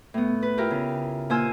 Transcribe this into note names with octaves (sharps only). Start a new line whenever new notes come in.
A2 B3
B4
E4 F4 G4 A#4
C#3
A#2 F4 C5 G#5 E6